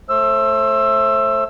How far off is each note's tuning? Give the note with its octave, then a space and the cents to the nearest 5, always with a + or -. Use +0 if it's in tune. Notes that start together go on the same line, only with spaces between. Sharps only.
A3 +0 C5 +35 E6 +15